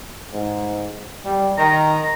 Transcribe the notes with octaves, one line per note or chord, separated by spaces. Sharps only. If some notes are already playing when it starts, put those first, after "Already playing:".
G#2
G3
D#3 A#5